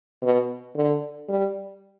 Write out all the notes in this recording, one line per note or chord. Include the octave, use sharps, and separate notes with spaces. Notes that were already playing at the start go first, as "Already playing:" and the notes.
B2
D3
G3